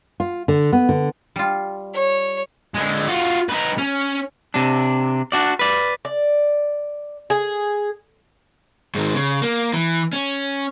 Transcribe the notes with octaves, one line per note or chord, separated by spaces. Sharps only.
F4
D3
B3
D3
G3 F4
C#5
D3 G#3
F4 F#4
D#4 B4
C#4
C3 D4
D4 F#4 D5
B4 D5
D5
G#4
G#2 D#3
C#3
A#3
E3
C#4